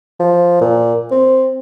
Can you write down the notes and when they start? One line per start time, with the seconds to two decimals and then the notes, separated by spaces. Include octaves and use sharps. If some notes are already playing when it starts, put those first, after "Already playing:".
0.20 F3
0.61 A#2
1.11 C4